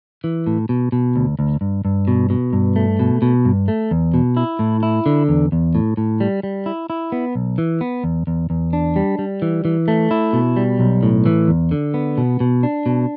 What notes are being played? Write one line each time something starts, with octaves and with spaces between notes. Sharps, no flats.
E3
A2
B2
B2
D2
D2
G2
G2
B2
B2
G2
A3
B2
B2
G2
A3
E2
B2
E4
A2
E4
D3
E2
E2
A2
A2
G3
G3
E4
E4
B3
B1
E3
B3
E2
E2
E2
D4
G3
G3
E3
E3
A3
E4
B2
G3
B1
A2
E3
E2
D3
B3
B2
B2
D4
B2